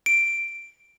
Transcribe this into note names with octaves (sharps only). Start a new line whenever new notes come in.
D7